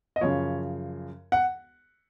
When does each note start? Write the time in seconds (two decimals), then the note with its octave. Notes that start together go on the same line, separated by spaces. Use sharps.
0.16 D#5
0.21 F#2 C#3 F3 C#5
1.32 F#5